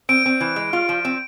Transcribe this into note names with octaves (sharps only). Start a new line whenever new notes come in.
C4 D7
C4
E3
G#3
F4
F3
C4